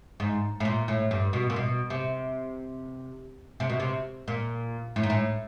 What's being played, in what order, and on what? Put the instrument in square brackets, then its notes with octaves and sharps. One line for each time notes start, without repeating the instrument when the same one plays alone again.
[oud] G#2
A2
A#2
A2
G2
B2
A#2
B2
C3
C3
B2
C3
A#2
A2
G#2
A2